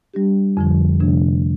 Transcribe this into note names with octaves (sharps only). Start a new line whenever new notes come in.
G3 D4 G4
F2 D3 F3
C3 F3 A3 D4